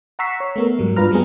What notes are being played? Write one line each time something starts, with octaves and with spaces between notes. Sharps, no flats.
F#5 A#5 C#6 E6 B6 C7
C#5
A3 B3 A#4
G#2 F#3 G3
G2 D4 F4 B4 A#5 F6
F#3 G#3 B3 C4 G#4